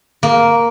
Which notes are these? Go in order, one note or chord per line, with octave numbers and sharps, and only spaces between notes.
A#3